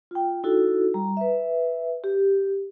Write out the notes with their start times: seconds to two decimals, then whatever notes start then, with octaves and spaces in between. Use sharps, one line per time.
0.11 F4 G5
0.44 D#4 E4 F#4 A4
0.94 G3 A#5
1.17 B4 E5
2.04 G4